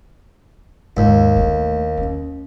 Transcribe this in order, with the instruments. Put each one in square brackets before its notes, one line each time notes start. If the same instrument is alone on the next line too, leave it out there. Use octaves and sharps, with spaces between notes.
[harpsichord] D#2 [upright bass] G#2
[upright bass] D3 A3
C#4